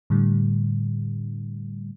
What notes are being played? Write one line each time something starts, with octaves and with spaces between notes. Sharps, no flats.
A2 D3 G3